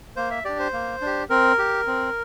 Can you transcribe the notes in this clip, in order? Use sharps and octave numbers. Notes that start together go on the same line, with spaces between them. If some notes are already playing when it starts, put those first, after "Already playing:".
A#3 C5
E5
D4 G4 D5
C5
A#3
D4 G4
C4 A#4
G4
C4